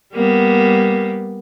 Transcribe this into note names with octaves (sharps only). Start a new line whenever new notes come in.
G3 A#3 B3